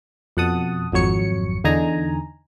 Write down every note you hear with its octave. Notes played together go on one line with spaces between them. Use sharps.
F2 B2 F#5 A5 D#6
G#1 F2 F#3 C#5 C#7
E2 D3 D#4 G#5 A#5